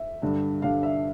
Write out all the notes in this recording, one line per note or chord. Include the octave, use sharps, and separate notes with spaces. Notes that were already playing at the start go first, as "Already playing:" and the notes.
Already playing: E5
G2 D3 G3 D4
G2 D3 G3 D4 F5
E5